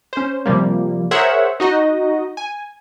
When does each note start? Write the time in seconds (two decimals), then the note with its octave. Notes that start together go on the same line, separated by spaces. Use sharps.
0.13 C#4 C5
0.46 C3 F3 G3 A#3
1.11 G#4 A#4 C5 C#5 E5 F#5
1.60 D#4 F#4 D#5
2.37 G#5